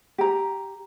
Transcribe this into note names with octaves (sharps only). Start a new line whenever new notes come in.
G4 A#5